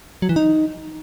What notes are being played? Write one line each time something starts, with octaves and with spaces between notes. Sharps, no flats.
F#3
E3
D#4